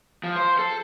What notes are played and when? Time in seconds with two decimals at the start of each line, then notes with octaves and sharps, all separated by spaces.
0.23 F3
0.36 C5
0.59 A4